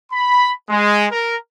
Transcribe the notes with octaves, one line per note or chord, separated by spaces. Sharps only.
B5
G#3
A#4